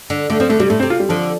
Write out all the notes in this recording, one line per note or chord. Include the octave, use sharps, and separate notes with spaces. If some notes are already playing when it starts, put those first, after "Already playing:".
D3
D3 A3
F3 C4
D3 A3
C3 G3
A2 A3
C4
C3
F4
G3
D3 F3